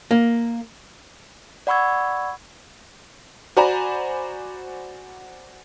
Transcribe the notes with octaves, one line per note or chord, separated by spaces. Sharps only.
A#3
D5 F#5 B5 C#6 E6 G#6
F#4 C5 D5 G#5 A#5 B5